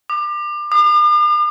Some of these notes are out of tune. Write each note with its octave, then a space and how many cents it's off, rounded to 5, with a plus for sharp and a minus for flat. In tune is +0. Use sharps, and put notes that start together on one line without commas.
D6 +30
D6 +45